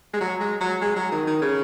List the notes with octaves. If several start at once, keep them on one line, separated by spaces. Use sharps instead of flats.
G#3
F#3
G#3
F#3
G#3
F#3
D#3
D#3
C#3